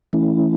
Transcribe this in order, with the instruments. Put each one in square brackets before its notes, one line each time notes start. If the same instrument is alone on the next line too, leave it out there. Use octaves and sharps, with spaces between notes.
[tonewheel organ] E3 A3 C#4 E4